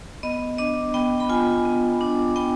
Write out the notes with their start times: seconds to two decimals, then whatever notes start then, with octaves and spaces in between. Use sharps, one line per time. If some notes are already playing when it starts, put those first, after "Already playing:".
0.23 B3 D#5
0.58 D4 D#5
0.94 B3 G5
1.20 B5
1.29 F4 G#5
1.65 B3
2.01 D4
2.36 B3 G5